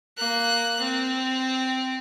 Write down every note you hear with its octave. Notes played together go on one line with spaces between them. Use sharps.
A#3 F#6
C4